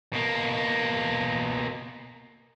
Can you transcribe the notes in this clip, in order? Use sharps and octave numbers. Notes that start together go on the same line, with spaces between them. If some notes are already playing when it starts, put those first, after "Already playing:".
B2 A#3